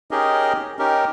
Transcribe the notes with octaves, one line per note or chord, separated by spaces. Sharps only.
C#4 D#4 G4 G#4 A#4 D#5
C#4 D#4 G4 A#4